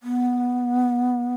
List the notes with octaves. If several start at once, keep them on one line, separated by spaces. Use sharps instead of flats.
B3